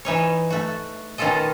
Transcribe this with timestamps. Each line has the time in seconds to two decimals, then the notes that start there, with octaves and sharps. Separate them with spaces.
0.05 E3 D#4 C#5
0.50 A3 F#4
1.18 B2 D#3 C#4 F4 A4 D#5